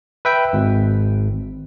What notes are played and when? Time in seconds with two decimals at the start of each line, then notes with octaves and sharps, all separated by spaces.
0.25 B4 E5 G5
0.53 G#1